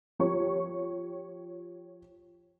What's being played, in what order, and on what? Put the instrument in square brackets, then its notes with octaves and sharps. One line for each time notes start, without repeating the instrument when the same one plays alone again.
[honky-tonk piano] F3 G4 C#5 C#6